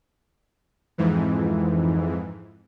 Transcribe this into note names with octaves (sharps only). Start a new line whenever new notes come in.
F2 G#2 E3